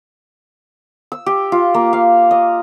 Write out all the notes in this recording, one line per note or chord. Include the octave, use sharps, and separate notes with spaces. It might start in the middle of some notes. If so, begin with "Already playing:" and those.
E6
G4
F4
A#3
F5
D#5